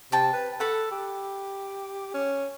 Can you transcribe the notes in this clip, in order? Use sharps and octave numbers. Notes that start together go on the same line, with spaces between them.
C3 G5 A5
B4
A4 F#5 B5
G4
C#4